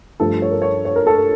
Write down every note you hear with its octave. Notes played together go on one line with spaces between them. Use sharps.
G2 F3 A3 A4
C#5
A#4
C#5
C#5
A#4
A4
A#4